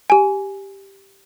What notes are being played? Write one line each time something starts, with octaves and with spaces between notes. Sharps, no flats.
G4 G#5